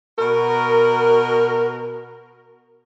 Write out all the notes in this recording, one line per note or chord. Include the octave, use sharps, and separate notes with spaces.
B2 F#4 A#4